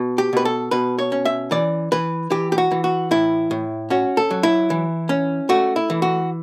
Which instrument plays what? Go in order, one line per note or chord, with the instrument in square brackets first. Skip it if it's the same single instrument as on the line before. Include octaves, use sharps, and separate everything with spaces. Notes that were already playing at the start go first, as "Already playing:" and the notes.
Already playing: [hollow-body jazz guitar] B2
G4
B2 B4
A4
B2 B4
C#5
C#4
E5
E3 D5
E3 B4
E3 G4
G4
F#4
E3
F#4
A2 E4
A2
C#4 F#4
A4
F#3
E4
E3
C#4
A3 F#4
E4
E3
F#4